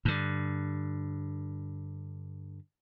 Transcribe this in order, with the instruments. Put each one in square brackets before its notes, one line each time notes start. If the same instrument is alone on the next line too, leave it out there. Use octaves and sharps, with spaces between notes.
[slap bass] G2 D3